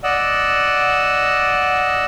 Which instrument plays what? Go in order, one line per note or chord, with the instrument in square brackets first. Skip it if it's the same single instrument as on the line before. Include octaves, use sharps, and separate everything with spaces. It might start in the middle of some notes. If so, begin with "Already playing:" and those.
[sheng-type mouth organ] D5 D#5 F#5 E6